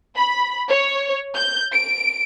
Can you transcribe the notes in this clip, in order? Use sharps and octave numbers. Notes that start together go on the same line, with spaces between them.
B5
C#5
G6
D7